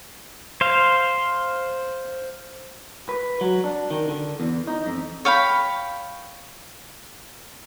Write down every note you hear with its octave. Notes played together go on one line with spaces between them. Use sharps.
C5 F5
B4
F#3
D4
D#3
D3
E2
D#4
F2
C#5 F5 G5 B5